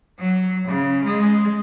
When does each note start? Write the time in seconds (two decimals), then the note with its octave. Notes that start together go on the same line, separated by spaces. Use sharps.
0.19 F#3
0.68 C#3
1.06 G#3